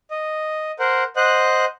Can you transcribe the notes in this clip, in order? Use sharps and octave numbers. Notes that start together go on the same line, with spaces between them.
D#5
A#4 C5 F#5
C5 D#5 F#5 F#6